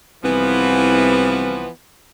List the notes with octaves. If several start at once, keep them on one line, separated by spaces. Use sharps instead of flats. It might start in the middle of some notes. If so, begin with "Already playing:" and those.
C2 E3 F3 B3